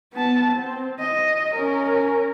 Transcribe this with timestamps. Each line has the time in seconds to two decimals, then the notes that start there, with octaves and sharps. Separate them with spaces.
0.13 B3 A5
0.51 C4
1.00 D#5
1.55 C#4 A#4